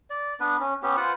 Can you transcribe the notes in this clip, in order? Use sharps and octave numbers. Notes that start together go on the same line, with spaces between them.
D5
B3 D4 B4
C#4
B3 C#4 G4
F4 B4 C5 F#5